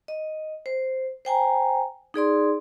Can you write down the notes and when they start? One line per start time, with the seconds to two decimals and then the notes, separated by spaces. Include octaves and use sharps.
0.08 D#5
0.66 C5
1.25 C5 G5 G#5 A#5
2.14 D#4 G#4 D5 C6